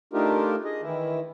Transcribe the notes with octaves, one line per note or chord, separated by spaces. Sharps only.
A3 D4 D#4 F4 G4 A#4
G#4 D#5
D#3 E3 E4